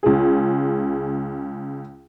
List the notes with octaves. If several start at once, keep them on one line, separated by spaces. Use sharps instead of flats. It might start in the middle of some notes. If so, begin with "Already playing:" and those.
C#2 G#4